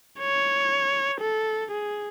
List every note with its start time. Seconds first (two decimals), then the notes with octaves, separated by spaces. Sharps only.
0.20 C#5
1.21 A4
1.72 G#4